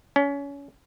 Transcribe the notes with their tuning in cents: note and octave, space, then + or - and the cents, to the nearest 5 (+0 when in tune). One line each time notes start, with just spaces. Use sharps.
C#4 +25